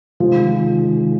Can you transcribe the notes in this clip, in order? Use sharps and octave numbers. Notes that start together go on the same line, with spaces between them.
C3 D#3 F3 G#3